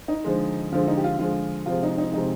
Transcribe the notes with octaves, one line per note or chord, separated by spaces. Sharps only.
D#4
D3 F3 G#3
D3 F3 G#3 F4
D#4
G4
F4
D3 F3 G#3 F4
C3 F3 G#3 F4
D#4
D#4
C3 F3 G#3 D#4